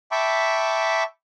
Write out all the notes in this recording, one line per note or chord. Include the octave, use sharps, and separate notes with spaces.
E5 G5 A5 B5 C#6 D6